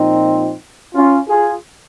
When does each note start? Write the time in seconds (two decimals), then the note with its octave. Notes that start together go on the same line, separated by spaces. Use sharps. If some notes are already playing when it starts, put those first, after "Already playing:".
Already playing: A#2 F3 C4 D#4
0.94 C#4 F4
1.28 F4 G#4